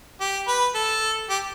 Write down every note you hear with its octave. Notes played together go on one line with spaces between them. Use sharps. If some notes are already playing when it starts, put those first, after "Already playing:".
G4
B4
A4
G4